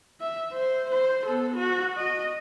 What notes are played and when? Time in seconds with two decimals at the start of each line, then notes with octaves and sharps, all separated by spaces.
0.20 E5
0.52 C5
0.89 C5
1.25 B3 A4
1.56 F#4
1.96 D#5